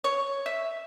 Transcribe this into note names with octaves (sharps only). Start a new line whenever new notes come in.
C#5
E5